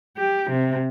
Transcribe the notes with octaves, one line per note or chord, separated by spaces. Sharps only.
G4
C3